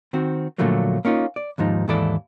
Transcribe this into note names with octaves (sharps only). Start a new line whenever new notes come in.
D#3 C4 F#4
A#2 D3 F3 F#3 A3 A#3
A#3 C#4 D#4 F4
D5
D#2 G#2 F3 D#4
D#2 G#2 E3 E4 A4 D5